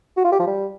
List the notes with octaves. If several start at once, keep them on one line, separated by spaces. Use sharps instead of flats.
F#4
F4
G4
F3
G3